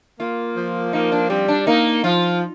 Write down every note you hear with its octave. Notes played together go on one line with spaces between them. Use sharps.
A#3 F4
F3
A#3 D#4
D4
G3 C4
D4
A#3 D#4
F3 F4